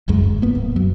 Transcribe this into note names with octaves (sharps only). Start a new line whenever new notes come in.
F#1 C#2 F#2 G#3
G#1
A#3 B3
D1
F#2 F#3